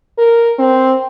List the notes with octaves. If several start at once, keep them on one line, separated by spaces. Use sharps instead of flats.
A#4
C4